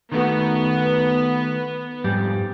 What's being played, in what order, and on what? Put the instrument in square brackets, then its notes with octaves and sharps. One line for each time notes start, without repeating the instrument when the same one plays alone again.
[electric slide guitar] D#3 A3 F#4 [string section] B3
[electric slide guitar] F2 G#2 G3